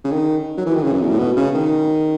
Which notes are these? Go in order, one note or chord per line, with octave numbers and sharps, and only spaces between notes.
C#3
D#3
F#3
E3
D#3
C#3
F#2
E2
A2
B2
C#3
D#3